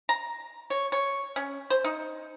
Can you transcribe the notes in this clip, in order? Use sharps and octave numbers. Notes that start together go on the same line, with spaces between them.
A#5
C#5
C#5
C#4
C5
D#4